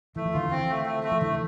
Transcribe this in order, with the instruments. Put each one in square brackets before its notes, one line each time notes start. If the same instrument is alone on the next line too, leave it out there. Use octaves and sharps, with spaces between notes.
[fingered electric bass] E3 [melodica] A3
[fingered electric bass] F3
[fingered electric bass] D3 E3 [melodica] F4
[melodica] C4
A3
A3
A3
[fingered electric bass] F3
[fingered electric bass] D3 E3 [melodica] A3